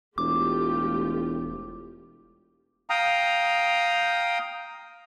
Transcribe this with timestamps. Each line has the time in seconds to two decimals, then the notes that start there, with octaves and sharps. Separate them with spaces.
0.18 E1 A3 F4 G4 D6
2.90 F5 G5 A#5 D#6